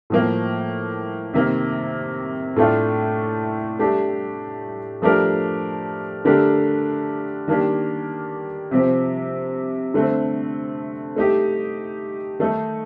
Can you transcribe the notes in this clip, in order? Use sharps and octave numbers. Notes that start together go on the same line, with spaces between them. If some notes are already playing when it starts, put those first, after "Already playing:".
A2 F3 A#3
C3 D#3 A#3
A2 A3 D4 F4
A3 D4 G4
F3 A3 D4 G4 A#4
D3 A3 D4 G4 A#4
D#3 A#3 D4 G4
C3 F3 C4 G4
D3 A3 C4
A3 D#4 G4
D#3 A3 D#4 A4